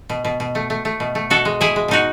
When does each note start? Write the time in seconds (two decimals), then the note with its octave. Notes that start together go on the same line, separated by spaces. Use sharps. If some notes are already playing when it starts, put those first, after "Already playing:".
0.10 B2
0.25 B2
0.40 B2
0.55 A3
0.70 A3
0.85 A3
1.00 B2
1.15 A3
1.30 B2 F#4 A4
1.45 G#3
1.60 B2 E4 G#4
1.76 G#3
1.88 B2 D#4 F#4